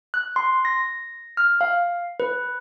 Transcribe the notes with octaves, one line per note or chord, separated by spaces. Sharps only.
F#6
C6
A#6
F6
F5
B4